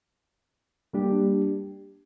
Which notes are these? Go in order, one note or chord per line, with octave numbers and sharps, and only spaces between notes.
G3 A#3 D4 G4